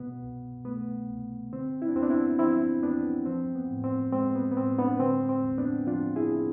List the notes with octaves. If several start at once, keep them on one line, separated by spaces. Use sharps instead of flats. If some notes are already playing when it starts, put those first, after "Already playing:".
Already playing: B2 B3
C2
A3 B3
C2
D3 C4
E4
D4
E2 C4
B3 D4
C4 E4
F3 C4 E4
E2 B3 D4
F3 C4
B3
A2
C4
G#3 C4
B3
B3
A2 C4
B3 D4
D3 C4
C4
E2
B3 D4
F3 D4 F4
E4 G#4